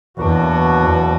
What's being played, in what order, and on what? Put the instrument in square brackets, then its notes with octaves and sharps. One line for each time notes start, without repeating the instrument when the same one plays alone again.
[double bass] E2 [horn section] B2 F#3 A#3 D4 F#4
[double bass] E2